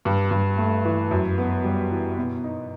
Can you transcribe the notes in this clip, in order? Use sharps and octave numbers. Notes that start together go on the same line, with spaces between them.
G2
G2
A3
E3
F#2
B3
G3
E3
B2
D#4